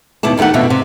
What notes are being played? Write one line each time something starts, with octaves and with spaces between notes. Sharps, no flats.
D#2 B2 E4 D5 A5
D2 D#3 A3 G4 F#5
F2 B2 D3 F4 E5
C3